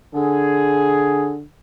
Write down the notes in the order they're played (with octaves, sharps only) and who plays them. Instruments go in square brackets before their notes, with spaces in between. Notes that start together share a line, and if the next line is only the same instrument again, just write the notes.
[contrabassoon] D3 [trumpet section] G#4